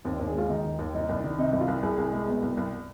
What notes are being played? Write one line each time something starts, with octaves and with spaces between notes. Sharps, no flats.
D#2 C4
D4
D#2
G#4
G#3 F4
D#3 D#4
D#2
D#2
C2 D#4
C2
D4
D#3
C3 D#4
C2
F4
C2
C2 G#4
C2
G#3
B2
C2
C2